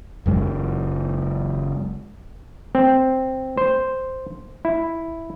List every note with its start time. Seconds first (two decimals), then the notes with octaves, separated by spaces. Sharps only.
0.26 F#1 F#2 G#3
2.75 C4
3.57 C5
4.65 E4